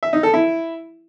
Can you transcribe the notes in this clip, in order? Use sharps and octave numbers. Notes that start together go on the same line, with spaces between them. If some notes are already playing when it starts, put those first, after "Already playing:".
E5
D#4
A4
E4